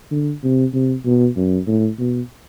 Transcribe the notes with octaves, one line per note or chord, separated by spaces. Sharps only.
D3
C3
C3
B2
F#2
A2
B2